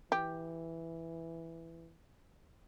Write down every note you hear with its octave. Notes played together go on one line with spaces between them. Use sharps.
E3 G4